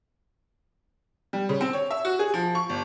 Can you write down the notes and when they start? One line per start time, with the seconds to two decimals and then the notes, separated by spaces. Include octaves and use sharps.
1.33 G3
1.49 C#3
1.61 C4
1.73 C#5
1.91 E5
2.05 F#4
2.19 G#4
2.34 F3
2.55 C#6
2.70 G1